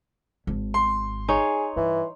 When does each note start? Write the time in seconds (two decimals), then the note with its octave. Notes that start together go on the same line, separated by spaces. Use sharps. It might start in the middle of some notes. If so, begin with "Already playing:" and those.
0.47 G#1
0.74 C6
1.29 D#4 G#4 C#5
1.76 G2 E3